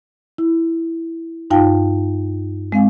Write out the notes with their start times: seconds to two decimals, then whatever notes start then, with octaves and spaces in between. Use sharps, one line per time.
0.38 E4
1.50 G2 D#4 F4 F5 G5 A5
2.72 G#3 C4 F5 G#5